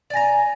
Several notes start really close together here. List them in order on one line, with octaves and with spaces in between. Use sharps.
D5 G#5 A#5